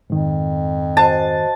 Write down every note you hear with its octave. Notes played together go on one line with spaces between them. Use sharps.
F2 G#2 D#3
F#4 C5 D#5 A5